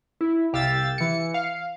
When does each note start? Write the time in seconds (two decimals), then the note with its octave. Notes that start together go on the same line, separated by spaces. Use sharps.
0.21 E4
0.53 C2 G4 F5 E6 A6
0.98 E3 C#7
1.34 F5